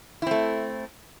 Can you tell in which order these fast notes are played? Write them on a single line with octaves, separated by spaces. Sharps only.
E4 C4 A3